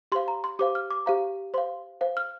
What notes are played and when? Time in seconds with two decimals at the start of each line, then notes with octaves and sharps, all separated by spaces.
0.12 G4 C5 F5 C6
0.28 A#5
0.44 C6
0.59 G4 C5 F5 D6
0.75 F6
0.90 D6
1.06 G4 C5 F5 A#5
1.54 C5 F5 C6
2.01 C5 F5
2.17 F6